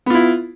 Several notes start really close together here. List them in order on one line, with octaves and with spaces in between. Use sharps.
B3 F4 E4